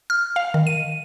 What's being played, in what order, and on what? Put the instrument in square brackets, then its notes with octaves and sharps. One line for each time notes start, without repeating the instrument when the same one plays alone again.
[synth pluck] F6
F5
D#3
D#7